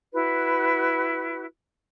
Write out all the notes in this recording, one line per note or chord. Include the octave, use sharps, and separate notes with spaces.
E4 F#4 B4